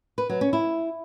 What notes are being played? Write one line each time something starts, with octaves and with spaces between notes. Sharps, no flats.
B4
F#3
C#4
E4